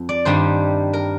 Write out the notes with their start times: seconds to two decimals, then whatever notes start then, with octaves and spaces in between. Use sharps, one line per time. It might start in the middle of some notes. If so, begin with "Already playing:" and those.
Already playing: F2
0.09 D5
0.25 G2 D#3 G3 C5
0.93 A#4